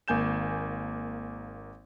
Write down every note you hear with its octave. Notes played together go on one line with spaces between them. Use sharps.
G#1 A#3 G#5 G6 E7